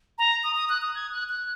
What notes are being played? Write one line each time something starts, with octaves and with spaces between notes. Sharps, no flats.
A#5
D#6
D#6
F#6
D#6
G#6
F#6
F#6